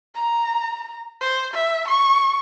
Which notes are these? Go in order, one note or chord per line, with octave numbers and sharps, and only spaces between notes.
A#5
C5
E5
C#6